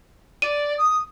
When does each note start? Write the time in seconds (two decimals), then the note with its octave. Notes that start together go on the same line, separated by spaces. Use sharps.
0.42 D5 D#7
0.78 D#6